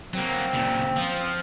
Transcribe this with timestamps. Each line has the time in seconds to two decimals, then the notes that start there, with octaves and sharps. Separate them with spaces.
0.13 F#3 A#3 C4
0.53 A#2 C#3
0.97 F3